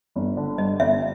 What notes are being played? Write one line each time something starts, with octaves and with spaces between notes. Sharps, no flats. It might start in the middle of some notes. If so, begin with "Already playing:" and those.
G1
D3
G2 D#5
G1 E5